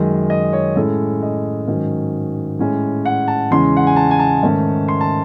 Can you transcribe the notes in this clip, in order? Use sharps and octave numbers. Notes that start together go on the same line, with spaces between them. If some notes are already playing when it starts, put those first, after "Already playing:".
Already playing: F#2 D#3 G#3
D#5
C#5
A2 G#3 C#4 A4
D#5
G#2 D#3 F#3 C#4
A2 G#3 C#4
F#5
A5
E2 C#3 G#3 C#4 C6
F#5
G#5
A5
G#5
A5
G#2 D#3 A3 C#4
C6
A5